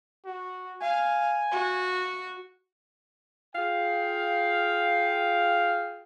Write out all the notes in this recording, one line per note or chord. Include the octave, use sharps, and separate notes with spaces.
F#4
F5 G#5
F#4
F4 G#4 F5 G5